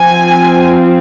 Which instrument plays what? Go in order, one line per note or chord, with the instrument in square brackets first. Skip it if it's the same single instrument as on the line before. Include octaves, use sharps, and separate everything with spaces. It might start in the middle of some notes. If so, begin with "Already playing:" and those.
Already playing: [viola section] F3 C4 G#5